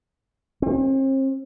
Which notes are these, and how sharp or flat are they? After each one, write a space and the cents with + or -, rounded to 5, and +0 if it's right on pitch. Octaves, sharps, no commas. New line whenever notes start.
C4 +40